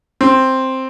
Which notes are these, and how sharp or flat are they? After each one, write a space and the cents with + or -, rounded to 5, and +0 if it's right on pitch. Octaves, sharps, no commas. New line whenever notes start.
C4 +5